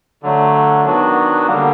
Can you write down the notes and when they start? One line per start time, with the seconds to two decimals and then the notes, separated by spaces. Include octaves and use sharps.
0.23 D3 F#3 A3
0.85 D#3 F#3 B3 D4 F#4
1.47 D3 G3 A#3